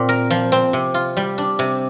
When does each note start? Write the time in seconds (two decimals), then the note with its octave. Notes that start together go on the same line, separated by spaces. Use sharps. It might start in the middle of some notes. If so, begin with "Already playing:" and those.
Already playing: A#2 C4
0.09 A#4
0.30 F3
0.52 C4
0.73 C3
0.94 F4
1.17 G3
1.38 D4
1.59 C3